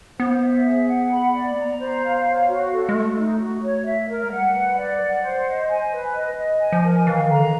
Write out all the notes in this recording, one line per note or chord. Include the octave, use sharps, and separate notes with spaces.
B3 C5
E5
G#4
F#5
B5
D5
A#3
B3 A#5
C5
F5
C#5
F#4
A4
G#3
A3 A4
D#4
F#4
C#5
E5
A#4
G#3
G3 F#5
B4
D5
F#3 F#5
C5
D#5
G#5
B4
D#5
D#5
G#5
F3
A#4
E3 F5
D#3
D3 A#5
D#3